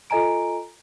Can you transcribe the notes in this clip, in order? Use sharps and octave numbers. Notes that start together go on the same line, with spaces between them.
F4 A4 D#5 G#5 A#5 D7